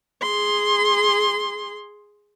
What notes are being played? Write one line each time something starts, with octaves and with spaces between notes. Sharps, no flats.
G#4 C6